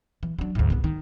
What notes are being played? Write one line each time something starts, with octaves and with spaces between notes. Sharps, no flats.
E3
F#3 D4
D2 G#2
C2 B3
D#3